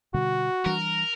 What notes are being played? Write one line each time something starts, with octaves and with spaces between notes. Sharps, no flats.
B2 D3 G3 F#4
E3 G3 D4 A#4